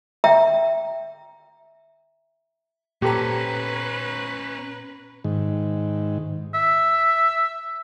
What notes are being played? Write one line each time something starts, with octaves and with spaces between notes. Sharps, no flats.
E5 G5 A#5
A#2 C#4 G4 A4 B4 C5 A#5
G#2 D#3
E5